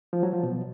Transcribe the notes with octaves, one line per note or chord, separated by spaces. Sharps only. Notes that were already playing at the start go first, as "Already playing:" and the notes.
F3
F#3
F3
B2